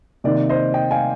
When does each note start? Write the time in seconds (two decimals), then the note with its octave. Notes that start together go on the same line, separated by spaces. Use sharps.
0.24 C3 D#3 A#3 D#4 D5
0.49 C5 D#5
0.74 D#5 G5
0.91 F5 G#5